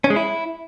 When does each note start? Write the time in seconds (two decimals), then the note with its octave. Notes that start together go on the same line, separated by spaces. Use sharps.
0.04 C#4
0.10 G#3
0.16 E4